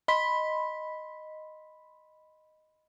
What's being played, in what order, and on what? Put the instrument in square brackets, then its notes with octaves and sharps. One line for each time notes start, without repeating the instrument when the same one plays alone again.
[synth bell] D#5 B5 C6 B6